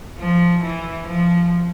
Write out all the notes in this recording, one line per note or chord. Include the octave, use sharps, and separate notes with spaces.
F3
E3
F3